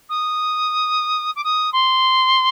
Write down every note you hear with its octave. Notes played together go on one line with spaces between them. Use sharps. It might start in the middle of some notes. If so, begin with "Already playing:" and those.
D#6
D6
D#6
C6